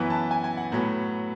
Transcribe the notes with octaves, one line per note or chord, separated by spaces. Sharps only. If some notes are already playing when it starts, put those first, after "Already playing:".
Already playing: F#2 E3 B3 E4
A5
G#5
G#5
F#5
A2 F#3 B3